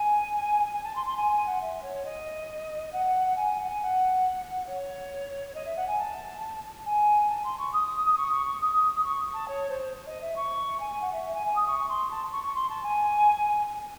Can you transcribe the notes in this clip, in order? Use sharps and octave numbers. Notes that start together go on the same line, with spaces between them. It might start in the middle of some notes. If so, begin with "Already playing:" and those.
Already playing: G#5
G#5
A5
C6
C6
G#5
G#5
F#5
E5
C#5
D#5
F#5
G#5
F#5
G#5
F#5
C#5
D#5
E5
F#5
G#5
A5
G#5
A5
C6
C#6
D#6
C#6
C#6
C#6
D#6
C#6
A5
C#5
C5
D#5
E5
C#6
G#5
G#5
F#5
E5
E5
G#5
G#5
D#6
C#6
C6
A5
C#6
C#6
C6
A5
G#5